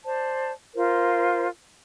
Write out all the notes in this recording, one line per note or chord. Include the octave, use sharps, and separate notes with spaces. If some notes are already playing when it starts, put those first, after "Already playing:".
C5 D5 A5
F4 A#4 C5